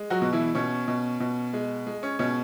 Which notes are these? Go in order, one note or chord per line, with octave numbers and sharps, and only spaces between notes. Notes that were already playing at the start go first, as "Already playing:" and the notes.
Already playing: G#3
F#3 F#4
B2
E3 E4
B2 C#4
B2
B2
G#3
G#3
C#4
B2 C#4